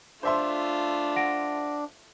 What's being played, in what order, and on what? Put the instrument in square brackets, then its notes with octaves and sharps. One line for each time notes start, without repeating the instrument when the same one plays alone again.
[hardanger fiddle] A3 F4 [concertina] D4 [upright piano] C5 E5 C6
[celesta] F#5 A#6 D7